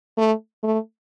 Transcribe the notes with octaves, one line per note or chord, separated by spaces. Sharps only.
A3
A3